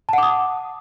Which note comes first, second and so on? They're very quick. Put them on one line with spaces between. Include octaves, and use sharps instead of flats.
A5 F#5 D6 D#6